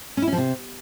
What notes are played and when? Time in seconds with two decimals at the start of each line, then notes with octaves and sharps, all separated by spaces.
0.17 C#4
0.22 E4
0.27 C#4
0.32 F3
0.38 C3